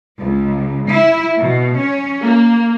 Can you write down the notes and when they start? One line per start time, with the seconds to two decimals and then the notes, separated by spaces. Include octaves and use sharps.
0.20 C#2
0.89 E4
1.38 B2
1.78 C#4
2.22 A#3